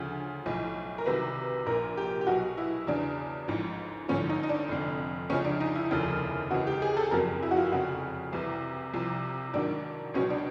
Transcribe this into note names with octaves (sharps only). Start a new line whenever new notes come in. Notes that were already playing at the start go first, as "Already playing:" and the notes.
Already playing: D2 C#3 F3
B1 A2 F3
A#4
C2 C3 D#3 F#3 B4
A#1 A#2 F3 A#4
G4
G4
B1 B2 F#3 F#4
E4
E2 C#3 E3 D4
A1 G#2 F3
A1 G2 D3 F3 C#4
D#4
D#4
D4
F1 F2 D3
C#2 C#3 F3 C#4
D4
D#4
E4
F1 D#2 C#3 F3
C#2 C#3 E3 F#4
G4
G#4
A4
F#1 F2 C#3 F#3 A#4
E4
F#4
F4
F1 F2 C#3 F#4
C2 C3 E3
C2 C3 F3
A1 G#2 D#3 F#3 D4
C#2 B2 F#3 C#4
D4